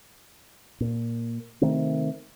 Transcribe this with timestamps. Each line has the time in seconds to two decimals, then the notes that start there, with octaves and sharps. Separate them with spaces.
0.80 A#2
1.61 C3 D#3 A3 C4